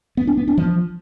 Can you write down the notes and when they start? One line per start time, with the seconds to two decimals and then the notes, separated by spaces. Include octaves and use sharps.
0.17 B3
0.27 D4
0.37 B3
0.48 D4
0.58 F3